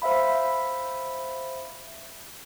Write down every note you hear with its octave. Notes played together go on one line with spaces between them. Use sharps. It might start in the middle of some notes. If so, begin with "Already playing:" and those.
C5 E5 F5 B5